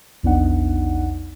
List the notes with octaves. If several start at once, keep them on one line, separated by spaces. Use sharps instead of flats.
A#1 E2 B3 D4 D#4 F#5